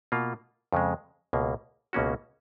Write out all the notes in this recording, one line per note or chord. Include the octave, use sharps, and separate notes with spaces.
B2 A#3 F4
F2 C#3 G#3
C#2 B2 A#3
C#2 B2 A#3 C#4 F#4